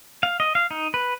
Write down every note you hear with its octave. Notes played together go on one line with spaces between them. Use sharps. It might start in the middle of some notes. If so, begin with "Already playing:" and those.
F5
D#5
F5
D#4
B4